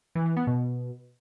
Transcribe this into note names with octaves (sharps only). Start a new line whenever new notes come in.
E3
E3
B3
B2